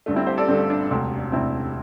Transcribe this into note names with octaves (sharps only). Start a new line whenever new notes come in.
G1 G2 D3 A3
C4 E4
G4 C5
A4 D5
G1 G2 D3 A3 C4
D4
E1 D2 C3
E1 D2 C3 C4 E4